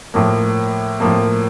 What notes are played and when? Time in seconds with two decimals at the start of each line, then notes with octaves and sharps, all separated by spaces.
0.14 A2 F3 A#3
1.00 A2 F3 A#3